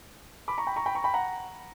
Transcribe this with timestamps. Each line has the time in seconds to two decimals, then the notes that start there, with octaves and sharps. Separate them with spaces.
0.48 B5 D6
0.58 A#5 C#6
0.67 G5 B5
0.76 A#5 C#6
0.86 G5 B5
0.95 A#5 C#6
1.04 G5 B5
1.14 F#5 A#5